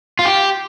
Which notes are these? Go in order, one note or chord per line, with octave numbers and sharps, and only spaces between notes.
F4
G4